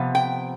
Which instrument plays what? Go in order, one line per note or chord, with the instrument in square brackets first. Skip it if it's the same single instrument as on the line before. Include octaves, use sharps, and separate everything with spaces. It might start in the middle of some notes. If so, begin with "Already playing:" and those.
Already playing: [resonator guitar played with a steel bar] C3 F3 B3
G5